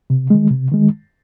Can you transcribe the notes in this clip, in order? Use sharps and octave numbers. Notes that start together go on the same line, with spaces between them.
C3
D#3 G#3
C3
D#3 G#3